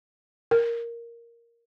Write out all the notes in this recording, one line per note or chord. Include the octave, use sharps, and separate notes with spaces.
A#4